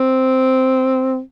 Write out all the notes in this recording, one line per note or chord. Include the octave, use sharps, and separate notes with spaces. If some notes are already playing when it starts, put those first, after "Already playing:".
Already playing: C4